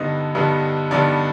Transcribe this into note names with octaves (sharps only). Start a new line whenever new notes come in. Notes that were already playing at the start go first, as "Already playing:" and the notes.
Already playing: G2 D3 G3 B3 D#4 D#5
G2 D3 G3 B3 D#4
G2 D3 G3 B3 D#4 D5